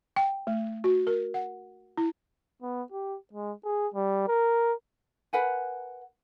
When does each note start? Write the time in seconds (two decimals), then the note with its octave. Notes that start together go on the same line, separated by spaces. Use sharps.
0.16 G5
0.47 A3
0.84 F#4
1.07 A#4
1.34 F#5
1.98 E4
2.62 B3
2.92 G4
3.33 G#3
3.65 G#4
3.94 G3
4.28 A#4
5.33 A#4 B4 F#5 G#5